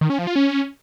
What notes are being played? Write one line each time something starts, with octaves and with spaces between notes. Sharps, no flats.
D#3
C#4
F3
F4
C#4